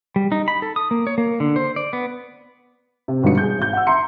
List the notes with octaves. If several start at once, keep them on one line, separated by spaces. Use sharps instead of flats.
G3
D#4
B5
A4
D#6
A#3
C#5
A#3
D3
C5
D5
B3
C3
G1 B2 D3 G3 D#4 C#7
G#4 G6
G#1 G6
F#5 E6
E5 A#5 C6 C#7